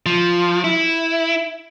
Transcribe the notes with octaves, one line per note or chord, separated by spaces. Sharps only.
F3
E4